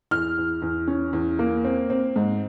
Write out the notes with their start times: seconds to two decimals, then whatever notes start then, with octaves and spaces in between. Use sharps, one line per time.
0.11 E2 F6
0.37 E2
0.62 E2
0.87 C#4
1.13 E2
1.39 A#3
1.64 C4
1.90 C4
2.16 G#2